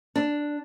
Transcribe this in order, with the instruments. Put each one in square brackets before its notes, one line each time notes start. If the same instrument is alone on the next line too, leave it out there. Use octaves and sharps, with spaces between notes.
[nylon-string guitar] D4